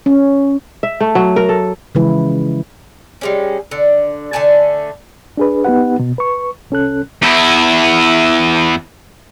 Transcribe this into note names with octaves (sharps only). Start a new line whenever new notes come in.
C#4
E5
A3
F#3
A#4
A4
C#3 E3 F3 G#3 E4 B4
G3 G#3 C#4
D3
D3 A3 G#5 A5
D4 G#4 B4
B3 D#4 G4 B4 F#5
B2
B4 C#6
C2 C#4 A4 F#6
E2 E4